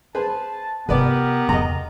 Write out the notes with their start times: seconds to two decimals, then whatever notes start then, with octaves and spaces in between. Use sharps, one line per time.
0.15 G#4 B4 C5 A5
0.89 C3 B3 F4 G4 A#4 B4 D5
1.49 E2 C#3 D#5 A#5